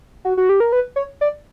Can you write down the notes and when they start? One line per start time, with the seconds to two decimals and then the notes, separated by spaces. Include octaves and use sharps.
0.25 F#4
0.37 F#4
0.49 G4
0.60 A#4
0.72 B4
0.96 C#5
1.21 D5